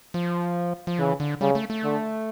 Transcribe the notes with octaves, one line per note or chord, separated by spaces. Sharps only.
F3
F3
C#3 E3
D3
C#3 G3
A3
A3
D3